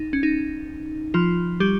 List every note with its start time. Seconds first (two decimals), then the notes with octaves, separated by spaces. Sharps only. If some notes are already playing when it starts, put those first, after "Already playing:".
Already playing: D#4
0.13 C#4
0.23 D#4
1.14 F3 F4
1.60 G3 G4